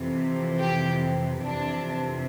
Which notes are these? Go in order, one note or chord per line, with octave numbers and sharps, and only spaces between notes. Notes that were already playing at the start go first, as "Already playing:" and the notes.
Already playing: F2 C3 E3
G4
F2 C3 E3 D4